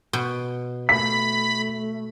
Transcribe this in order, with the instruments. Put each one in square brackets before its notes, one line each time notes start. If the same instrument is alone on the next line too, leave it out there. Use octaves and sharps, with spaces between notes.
[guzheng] B2
[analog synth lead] A3 [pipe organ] B5 [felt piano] B6